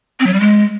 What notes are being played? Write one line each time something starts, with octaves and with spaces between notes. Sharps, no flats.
C4
F#3
G3
G#3